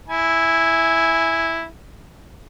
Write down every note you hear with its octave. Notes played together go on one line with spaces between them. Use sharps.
E4 G#5